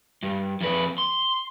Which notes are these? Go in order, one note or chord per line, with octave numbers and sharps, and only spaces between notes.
G2
F2 B4
C6